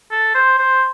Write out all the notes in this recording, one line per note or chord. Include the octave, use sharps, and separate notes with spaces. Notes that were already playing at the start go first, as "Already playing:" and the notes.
A4
C5
C5